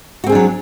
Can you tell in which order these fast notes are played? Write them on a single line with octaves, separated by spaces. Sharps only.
F#4 C4 G#4 D4 F#3